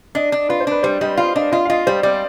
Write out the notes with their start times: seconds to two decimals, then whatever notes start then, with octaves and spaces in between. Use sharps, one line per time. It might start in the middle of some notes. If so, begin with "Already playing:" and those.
0.15 D4 D#5
0.32 D4
0.49 F4 B4
0.60 C5
0.67 D4 B4
0.83 G3 C5
1.01 G3 D#5
1.17 F4 F5
1.35 D4 D#5
1.52 F4 D#5
1.65 F5
1.70 F4 D#5
1.87 G3 C5
2.03 G3 D5